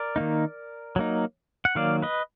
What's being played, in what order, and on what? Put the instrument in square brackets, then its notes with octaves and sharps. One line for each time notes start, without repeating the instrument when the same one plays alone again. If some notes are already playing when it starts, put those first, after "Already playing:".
Already playing: [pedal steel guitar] A#4 D5
D#3 A#3 D#4
F#3 A#3 D#4
F#5
D#3 F#3 A#3 D5 F5
B4 D#5